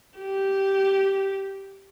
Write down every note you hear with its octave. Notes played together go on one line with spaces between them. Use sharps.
G4